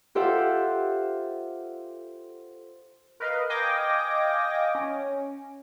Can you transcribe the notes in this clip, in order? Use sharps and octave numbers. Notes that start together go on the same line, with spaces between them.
F4 G4 A4 C5 E5 F#5
A#4 B4 D#5 F5
D#5 F5 G5 G#5 D6 A#6
C#4